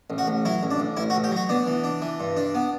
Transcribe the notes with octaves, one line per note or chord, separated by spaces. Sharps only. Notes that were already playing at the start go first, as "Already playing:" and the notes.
A1
F#4
A1
F#3 E4
A1
D4
A1
A1 E4
F#4
A1
G4
F#3
F#4
B3 D4
E3
D4
E3
G2
D4
B3